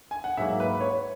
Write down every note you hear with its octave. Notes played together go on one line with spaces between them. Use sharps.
G#5
F#5
G#2 F#3 A#3 E5
B4
C#5